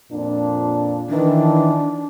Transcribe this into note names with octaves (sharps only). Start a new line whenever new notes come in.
F2 A#2 D4
D#3 E3 D4